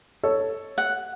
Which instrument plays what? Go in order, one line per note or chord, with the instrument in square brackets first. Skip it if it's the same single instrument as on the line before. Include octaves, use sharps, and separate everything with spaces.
[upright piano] A4 C#5
[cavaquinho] F#5